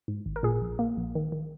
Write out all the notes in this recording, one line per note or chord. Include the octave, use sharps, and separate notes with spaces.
G#2
G#1
A#4
A#2 G#4
A#1
A#3
A#1
D#3
D#3